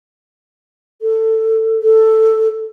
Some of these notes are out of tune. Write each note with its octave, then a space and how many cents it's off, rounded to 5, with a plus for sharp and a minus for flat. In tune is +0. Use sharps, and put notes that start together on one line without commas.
A4 +15
A4 +5